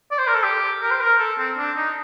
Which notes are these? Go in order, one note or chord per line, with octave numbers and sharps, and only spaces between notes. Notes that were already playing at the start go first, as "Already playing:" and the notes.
D5
C5
A#4
A4
G4
A#4
C5
A#4
A4
C4
D4
D#4